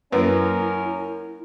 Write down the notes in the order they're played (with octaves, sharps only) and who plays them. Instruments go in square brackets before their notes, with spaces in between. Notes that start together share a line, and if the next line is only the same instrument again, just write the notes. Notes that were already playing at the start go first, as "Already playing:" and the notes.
[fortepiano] F#2 [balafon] A#3 B4 [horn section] C#4 A#4 [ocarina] E4